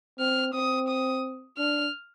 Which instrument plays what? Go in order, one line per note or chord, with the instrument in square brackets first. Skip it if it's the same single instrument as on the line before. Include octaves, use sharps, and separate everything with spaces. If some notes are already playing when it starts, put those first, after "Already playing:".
[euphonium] C4 [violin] F6
[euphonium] C4 [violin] D#6
[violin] D#6
[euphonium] D4 [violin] F6